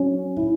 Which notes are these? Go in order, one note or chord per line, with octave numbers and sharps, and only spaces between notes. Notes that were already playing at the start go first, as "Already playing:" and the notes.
Already playing: F#3 C#4
E4